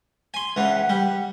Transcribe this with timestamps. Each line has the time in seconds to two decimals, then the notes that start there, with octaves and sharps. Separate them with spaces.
0.34 G#5 C6
0.56 C#2 E3 F#5
0.89 G3